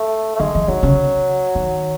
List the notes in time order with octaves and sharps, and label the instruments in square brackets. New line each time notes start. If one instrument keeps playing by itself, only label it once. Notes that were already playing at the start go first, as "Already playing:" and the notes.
Already playing: [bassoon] A3
A3
[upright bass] D#3 [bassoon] G#3
[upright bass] E3
[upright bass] D#3 [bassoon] F#3
[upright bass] C#3
D#3